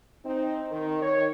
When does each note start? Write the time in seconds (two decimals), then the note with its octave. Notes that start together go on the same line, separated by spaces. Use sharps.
0.24 C4 D#4
0.71 D#3
1.02 D#3 C#5